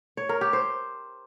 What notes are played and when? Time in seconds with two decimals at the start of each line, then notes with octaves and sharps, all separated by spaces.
0.17 C#5
0.29 A#4
0.41 G4
0.53 C5